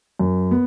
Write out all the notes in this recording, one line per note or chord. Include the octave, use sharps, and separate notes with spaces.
F#2
B3